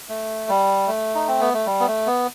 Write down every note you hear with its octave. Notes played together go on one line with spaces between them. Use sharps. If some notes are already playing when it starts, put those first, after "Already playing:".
A3
G3
A3
D#4
C4
B3
A3
G3
B3
A3
B3